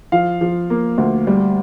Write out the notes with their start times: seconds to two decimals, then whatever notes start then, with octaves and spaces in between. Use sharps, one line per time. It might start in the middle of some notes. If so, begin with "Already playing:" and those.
0.12 F3 F5
0.41 F3
0.70 A#3
0.98 D2
1.27 G3